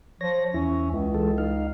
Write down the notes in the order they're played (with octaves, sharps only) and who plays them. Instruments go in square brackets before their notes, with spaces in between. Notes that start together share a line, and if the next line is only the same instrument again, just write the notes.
[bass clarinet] F3 [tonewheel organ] C#5 A#6
[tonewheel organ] E2 E4 [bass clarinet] C#4
[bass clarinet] C#2
[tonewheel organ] E3 G#3 A4
D#4 F5